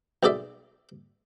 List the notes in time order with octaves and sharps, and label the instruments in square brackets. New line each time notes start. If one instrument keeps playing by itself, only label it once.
[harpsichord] B1 G#4 A4 D5 E5